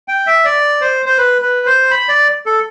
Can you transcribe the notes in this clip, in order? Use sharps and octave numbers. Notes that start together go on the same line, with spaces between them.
G5
E5
D5
C5
C5
B4
B4
C5
B5
D5
A4